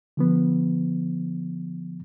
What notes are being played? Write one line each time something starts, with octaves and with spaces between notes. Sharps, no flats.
D3 F3 B3